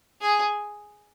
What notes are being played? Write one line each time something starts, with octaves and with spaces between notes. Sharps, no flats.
G#4